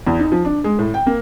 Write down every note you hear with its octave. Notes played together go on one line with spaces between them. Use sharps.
E2
D#4
F3
D4
G#3
A2
G5
A#3